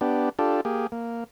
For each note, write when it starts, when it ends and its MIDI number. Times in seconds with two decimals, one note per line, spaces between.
0.01 0.29 59
0.01 0.29 62
0.01 0.29 67
0.39 0.61 62
0.39 0.61 65
0.39 0.61 67
0.39 0.61 69
0.65 0.87 58
0.65 0.87 67
0.65 0.87 68
0.92 1.24 58